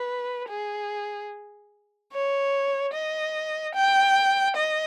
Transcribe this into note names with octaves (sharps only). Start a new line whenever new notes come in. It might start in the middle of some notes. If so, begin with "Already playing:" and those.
Already playing: B4
G#4
C#5
D#5
G5
D#5